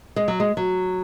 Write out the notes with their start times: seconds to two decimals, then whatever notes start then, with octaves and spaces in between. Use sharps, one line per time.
0.16 G#3
0.28 F#3
0.40 G#3
0.57 F#3